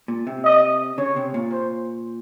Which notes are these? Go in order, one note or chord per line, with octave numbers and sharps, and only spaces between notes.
A#2
C3
D#5
C#3 C#5
C3
A#2
C5